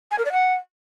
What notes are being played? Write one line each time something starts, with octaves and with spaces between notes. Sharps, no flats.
G#5
A#4
D5
F#5